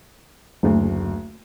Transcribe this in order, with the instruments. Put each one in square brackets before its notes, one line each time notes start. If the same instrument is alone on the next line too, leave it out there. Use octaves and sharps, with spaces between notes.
[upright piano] F#1 D2